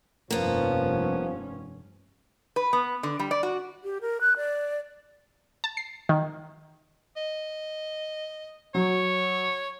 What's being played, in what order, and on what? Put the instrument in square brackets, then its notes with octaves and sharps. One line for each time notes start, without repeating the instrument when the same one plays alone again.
[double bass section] F1 G2 C#4 [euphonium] F3 [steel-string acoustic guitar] A#3 B3
[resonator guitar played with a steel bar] B4
B3
D3
G3
D5
F#4
[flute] G4
A#4
F#6
D5
[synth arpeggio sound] A5
C7
D#3
[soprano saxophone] D#5
[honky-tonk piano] F#3 [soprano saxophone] C#5